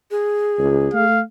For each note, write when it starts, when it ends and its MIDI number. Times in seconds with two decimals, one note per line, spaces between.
0.11 1.06 68
0.59 0.91 37
0.94 1.22 57
0.94 1.22 77